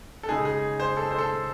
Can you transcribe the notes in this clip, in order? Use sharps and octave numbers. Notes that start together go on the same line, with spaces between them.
A4
C#3 G#3 D#4 G#4
G#4
C5
A4
C5
A4